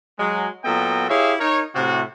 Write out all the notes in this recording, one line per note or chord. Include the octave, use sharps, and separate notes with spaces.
F#3 G#3
A#2 F#3 B3 A4 D#5 G5
E4 G4 G#4 C#5 E5 F5
D#4 A#4 C#5
A2 C3 F#4